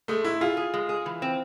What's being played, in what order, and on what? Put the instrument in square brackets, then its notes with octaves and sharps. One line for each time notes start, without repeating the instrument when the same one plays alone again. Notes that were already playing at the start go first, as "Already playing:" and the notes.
[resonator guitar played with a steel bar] G#3 [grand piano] A3
[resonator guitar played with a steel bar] G#2 [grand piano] E4
[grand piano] F4 [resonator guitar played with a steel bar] G#4
[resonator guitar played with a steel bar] G#4
G#3
G#4
E3
C4